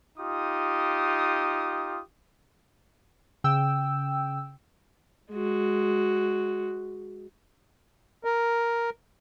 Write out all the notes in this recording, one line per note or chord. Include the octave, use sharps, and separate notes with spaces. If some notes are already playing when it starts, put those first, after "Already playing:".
D#4 F4 G4 D#6
C#3 G5 E6
G#3 F#4
A#4